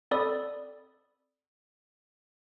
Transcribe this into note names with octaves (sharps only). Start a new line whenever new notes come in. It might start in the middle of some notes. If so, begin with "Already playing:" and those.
C4 A4 D5 B5 D#6